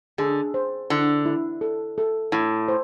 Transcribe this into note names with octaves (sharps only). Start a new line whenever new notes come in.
D3 G#4
C5
D3 E4
E4
A4
A4
A2 E4
C5